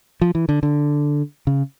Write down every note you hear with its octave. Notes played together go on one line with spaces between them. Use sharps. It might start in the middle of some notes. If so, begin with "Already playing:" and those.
F3
E3
D3
D3
C#3